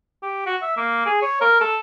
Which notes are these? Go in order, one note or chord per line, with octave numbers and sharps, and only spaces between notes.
G4
F#4
E5
A#3
G#4
C#5
A#4
A4